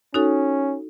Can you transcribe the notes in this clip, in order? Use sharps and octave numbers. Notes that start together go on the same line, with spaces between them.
C#4 D#4 F#4 A4